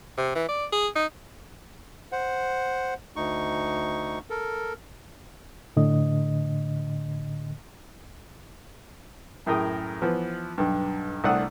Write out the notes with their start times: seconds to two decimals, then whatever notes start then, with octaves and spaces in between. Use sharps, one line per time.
0.18 C3
0.35 E3
0.49 D5
0.73 G#4
0.96 D#4
2.12 C5 F#5
3.16 D2 D#4 C#6
4.30 A4 A#4
5.76 A2 D3 D#5
9.46 F#2 A2 G#4 A#4 G5 D#6
10.02 E3 F3 B3
10.58 B1 G2
11.24 C2 A3 D4 F#5 D#6 E6